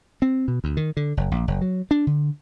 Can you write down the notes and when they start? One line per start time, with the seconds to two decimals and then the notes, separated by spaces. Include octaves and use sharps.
0.22 C4
0.48 B2
0.64 D2
0.77 D#3
0.97 D3
1.17 F#1
1.31 A#1
1.48 F#1
1.61 F#3
1.91 D4
2.07 D3